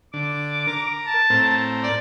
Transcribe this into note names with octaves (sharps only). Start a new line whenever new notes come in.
D3 D6
A#4
A5
A2 C4 A#4
D5